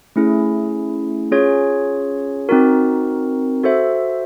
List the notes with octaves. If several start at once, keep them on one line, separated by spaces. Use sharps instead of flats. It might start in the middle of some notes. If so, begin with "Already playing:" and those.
A3 C#4 E4 G#4
C#4 F4 G#4 C#5
C4 D#4 F#4 A#4
F#4 A4 C5 E5